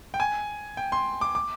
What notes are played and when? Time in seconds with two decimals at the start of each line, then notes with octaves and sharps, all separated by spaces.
0.14 G5
0.20 G#5
0.77 G5
0.92 C6
1.21 D6
1.35 D6